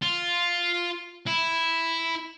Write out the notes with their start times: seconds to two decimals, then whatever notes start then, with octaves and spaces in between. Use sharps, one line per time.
0.02 F4
1.26 E4